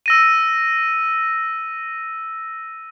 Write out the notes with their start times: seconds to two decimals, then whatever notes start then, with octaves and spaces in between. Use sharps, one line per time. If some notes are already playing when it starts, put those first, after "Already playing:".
0.06 E6 A#6 D#7